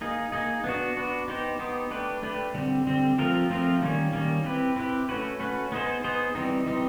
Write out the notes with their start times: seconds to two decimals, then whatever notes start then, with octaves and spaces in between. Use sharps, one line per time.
0.01 A#3 D#4 G#4
0.32 A#3 D#4 G#4
0.64 B3 D4 F#4
0.97 B3 D4 F#4
1.28 B3 D#4 G4 C5
1.59 B3 D#4 G4 C5
1.91 A3 D4 G4 B4
2.23 A3 D4 G4 B4
2.54 D3 G3 C4
2.87 D3 G3 C4
3.18 F3 A3 C4 F4 A#4
3.50 F3 A3 C4 F4 A#4
3.82 D#3 G3 A#3 C#4
4.13 D#3 G3 A#3 C#4
4.44 C4 E4 G4 B4
4.76 C4 E4 G4 B4
5.09 A3 C#4 F#4 B4
5.40 A3 C#4 F#4 B4
5.72 B3 D#4 G#4 C5
6.04 B3 D#4 G#4 C5
6.35 E3 G3 C4 D#4
6.66 E3 G3 C4 D#4